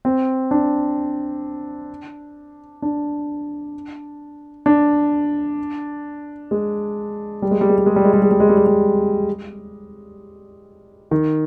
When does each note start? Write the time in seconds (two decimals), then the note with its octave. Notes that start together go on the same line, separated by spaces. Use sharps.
0.05 C4
0.51 D4
2.82 D4
4.66 D4
6.51 G#3
7.42 G3
7.51 G#3
7.61 G3
7.69 G#3
7.78 G3
7.86 G#3
7.96 G3
8.05 G#3
8.13 G3
8.22 G#3
8.31 G3
8.40 G#3
8.49 G3
8.57 G#3
8.66 G3
11.11 D#3